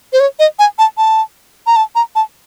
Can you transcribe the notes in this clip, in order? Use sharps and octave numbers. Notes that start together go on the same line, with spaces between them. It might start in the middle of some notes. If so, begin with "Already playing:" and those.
C5
C#5
D#5
G#5
A5
A5
A#5
A5
A#5
A5